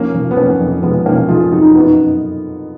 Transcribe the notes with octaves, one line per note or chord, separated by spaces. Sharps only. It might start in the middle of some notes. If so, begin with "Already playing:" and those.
Already playing: F3 A#3 C#4
F3
B3
F3 A#3 C#4
F2
F3 G#3 B3
F3 A#3 C#4
F3 F4 G#4
F2 D#4 F#4
F#2 B3 D#4
F#2